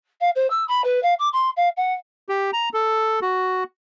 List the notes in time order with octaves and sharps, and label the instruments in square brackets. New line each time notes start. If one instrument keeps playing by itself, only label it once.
[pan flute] F5
C5
E6
B5
B4
F5
D6
C6
F5
F#5
[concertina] G4
A#5
A4
F#4